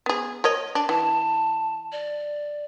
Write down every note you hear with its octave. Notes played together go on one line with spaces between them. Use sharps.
B3 G#4
A#4 C#5 D#5
D4
E3 A5
D5